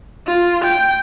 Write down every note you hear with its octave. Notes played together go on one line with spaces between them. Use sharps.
F4
G5